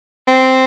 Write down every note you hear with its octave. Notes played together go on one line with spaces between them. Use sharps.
C4